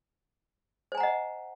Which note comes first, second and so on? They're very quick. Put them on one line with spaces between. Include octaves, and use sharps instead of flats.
C5 G#5 A#5 F#5 D#5